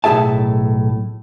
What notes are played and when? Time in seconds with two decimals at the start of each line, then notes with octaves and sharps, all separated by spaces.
0.04 B1 A2 C#4 G#4 E5 A5